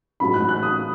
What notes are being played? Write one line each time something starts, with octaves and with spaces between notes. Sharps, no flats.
A1 G#2 F#3 B5
F#6
F#6
D#6